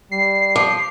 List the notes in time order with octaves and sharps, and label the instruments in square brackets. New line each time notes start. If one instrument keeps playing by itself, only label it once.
[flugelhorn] G3 [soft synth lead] C7
[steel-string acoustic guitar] F3 [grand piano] D6